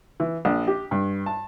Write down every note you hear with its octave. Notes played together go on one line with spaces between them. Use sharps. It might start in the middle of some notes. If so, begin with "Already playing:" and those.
E3
A#1
G4
G2
A5